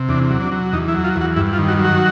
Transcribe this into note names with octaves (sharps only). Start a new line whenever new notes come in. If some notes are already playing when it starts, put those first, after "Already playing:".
Already playing: C3
E2 D4
F#3
D4
F#3
E2 D#4
E4
F#3
F4
E2
F#4
G2 E4
F4
D#3
F#4
F#3
F#4